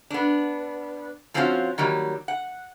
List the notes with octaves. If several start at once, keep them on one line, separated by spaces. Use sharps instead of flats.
B3 D4
F3 C4 C#4 D#4 F4 F#4
D#3 F#3 G3 A#3
F#5